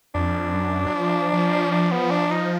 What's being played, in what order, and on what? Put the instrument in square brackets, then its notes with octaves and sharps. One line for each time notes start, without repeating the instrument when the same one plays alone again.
[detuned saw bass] F2 [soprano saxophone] D4
[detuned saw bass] F#2
F#3
F3
F3
[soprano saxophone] D4
B3
D4
D#4